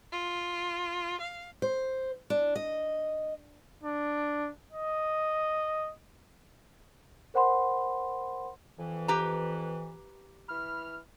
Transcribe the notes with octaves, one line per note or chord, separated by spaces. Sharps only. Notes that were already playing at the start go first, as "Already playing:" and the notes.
F4
F5
C5
D4
D#5
D4
D#5
A#4 C5 F#5 B5 C6
F2 E3
G4 B4 A#5
E3 B5 F6